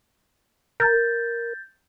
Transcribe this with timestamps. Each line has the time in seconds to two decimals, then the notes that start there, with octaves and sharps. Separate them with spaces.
0.80 A#4 G6 A6